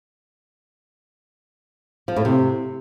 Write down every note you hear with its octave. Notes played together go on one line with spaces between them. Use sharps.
F3
A2
C3